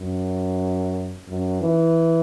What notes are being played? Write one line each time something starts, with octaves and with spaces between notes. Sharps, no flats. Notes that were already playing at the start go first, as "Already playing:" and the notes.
Already playing: F#2
F#2
E3